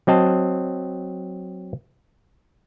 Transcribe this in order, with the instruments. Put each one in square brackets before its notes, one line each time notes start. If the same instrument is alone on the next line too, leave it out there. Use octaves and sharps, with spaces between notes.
[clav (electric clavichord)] F#3 C4 D#5 A5